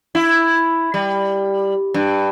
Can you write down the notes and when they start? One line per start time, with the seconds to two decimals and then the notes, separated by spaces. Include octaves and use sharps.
0.15 E4
0.94 G3
1.94 G2